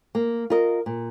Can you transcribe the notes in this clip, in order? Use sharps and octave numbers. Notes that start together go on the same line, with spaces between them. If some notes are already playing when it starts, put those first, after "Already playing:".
A#3
F4 A#4 D#5
A#2